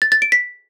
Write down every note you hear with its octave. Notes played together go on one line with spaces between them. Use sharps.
A6
A6
D7
B6